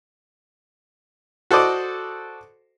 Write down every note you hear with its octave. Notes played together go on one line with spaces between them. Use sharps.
F#4 A4 C5 D5 D#5